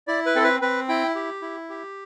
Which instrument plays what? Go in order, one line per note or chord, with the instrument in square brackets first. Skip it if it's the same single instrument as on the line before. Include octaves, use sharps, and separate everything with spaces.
[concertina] E4 D5
B4
C4 A4
B4
C4 B4
E4 G5
G4
E4
G4